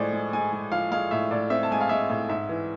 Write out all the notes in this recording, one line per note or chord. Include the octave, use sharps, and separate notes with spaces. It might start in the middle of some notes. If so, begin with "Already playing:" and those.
Already playing: A2 F3 G#3 C5 D5
G#3
G#3 G#5
G#3
F3 F5
G#3 F5
A2 E5
A2 D5
C4 E5
A5
G#3 G#5
F5
G#3 E5
A2
G#2 E5
E3